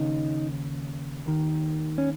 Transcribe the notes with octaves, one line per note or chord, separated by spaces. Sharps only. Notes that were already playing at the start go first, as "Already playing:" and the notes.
Already playing: D#2 C#3 D#4
D#2 D#3
C#4